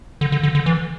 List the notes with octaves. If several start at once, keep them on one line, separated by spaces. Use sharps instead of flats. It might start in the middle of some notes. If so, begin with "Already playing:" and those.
D3
D3
D3
D3
E3